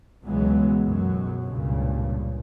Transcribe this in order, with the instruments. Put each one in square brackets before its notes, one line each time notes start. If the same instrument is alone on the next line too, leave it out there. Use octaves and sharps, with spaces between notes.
[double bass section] C#2 B2 E3 F#3 G#3 B3
B1 F#2 B2 F#3
C#2 G2 A#2 C#3